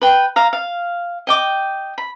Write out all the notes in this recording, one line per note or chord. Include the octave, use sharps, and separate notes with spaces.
B4 G5
F5 A#5
F5
D#5 G5 D6
B5